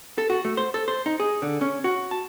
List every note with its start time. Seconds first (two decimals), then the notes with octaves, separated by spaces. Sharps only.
0.18 A4
0.30 F#4
0.45 A3
0.57 C5
0.74 A4
0.88 C5
1.06 D#4
1.20 G#4
1.42 D3
1.61 C#4
1.84 F#4
2.11 A5